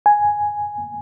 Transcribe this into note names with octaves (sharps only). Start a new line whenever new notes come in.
G#5